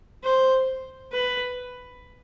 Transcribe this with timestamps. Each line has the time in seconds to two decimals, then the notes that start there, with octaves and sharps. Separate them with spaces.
0.24 C5
1.12 B4